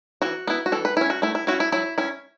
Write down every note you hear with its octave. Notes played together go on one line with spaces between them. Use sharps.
E3 F#4
B3 E4
F#4
E3 A4
B4
C#4 E4
F#4
A3 E4
E4
C#4 E4 F#4
E4
F#3 E4
C#4 E4